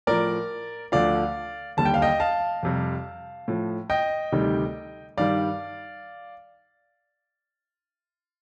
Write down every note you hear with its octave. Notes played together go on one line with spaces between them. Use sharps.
A2 F3 A#4 D5
D2 D3 F3 D5 F5
D#2 D3 G3 A5
G5
F5
D#5 G5
F5 A5
F2 C3 G3
A2 F3
D#5 G5
D2 C3 D#3 G3
G2 D#3 G3 D5 F5